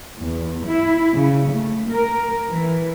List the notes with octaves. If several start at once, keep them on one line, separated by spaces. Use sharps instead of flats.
E2
E4
C#3
A3
A#4
E3